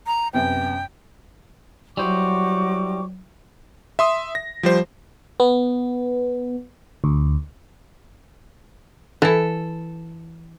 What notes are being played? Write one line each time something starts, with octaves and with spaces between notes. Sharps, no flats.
A#5
F#2 C3 B3 G5
F#3 G3 E4 F#4 C5 C#6 D6
E5 C6 D#6
A#6
F3 G3 C5
B3
D2
E3 E4 A4